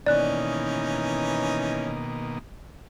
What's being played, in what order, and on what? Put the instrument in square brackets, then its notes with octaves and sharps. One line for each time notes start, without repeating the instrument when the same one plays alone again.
[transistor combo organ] B2 D#3 A#3 [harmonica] E3 C#4 D#4 [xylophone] D5 F#6